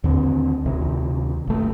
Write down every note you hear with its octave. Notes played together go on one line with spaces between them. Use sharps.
D#2 D3 C4
D2 C3 D#3
G1 A3